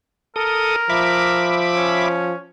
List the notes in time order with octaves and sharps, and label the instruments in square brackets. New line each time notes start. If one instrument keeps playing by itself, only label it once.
[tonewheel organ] A4 D#6 [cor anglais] A#4
[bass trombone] F3 [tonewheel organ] E5 B5 D6
[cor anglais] C#4